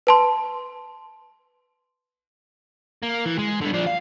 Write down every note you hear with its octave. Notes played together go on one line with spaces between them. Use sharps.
B4 A5 C6
A#3
E3
G#3
D3 G3
F3 D4
F5